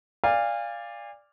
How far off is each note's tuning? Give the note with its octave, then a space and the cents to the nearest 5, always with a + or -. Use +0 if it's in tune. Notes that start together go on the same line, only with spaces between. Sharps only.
D5 +0 F5 -10 G#5 -35